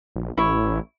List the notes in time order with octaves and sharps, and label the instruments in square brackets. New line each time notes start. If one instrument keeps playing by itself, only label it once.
[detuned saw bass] A#1
[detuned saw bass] A1 [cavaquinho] E4 C#5